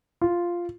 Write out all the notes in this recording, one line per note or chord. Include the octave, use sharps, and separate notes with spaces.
F4